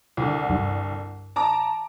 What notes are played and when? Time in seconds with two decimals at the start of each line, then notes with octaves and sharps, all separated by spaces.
0.17 C2 D3
0.50 G2
1.36 A5 A#5 D6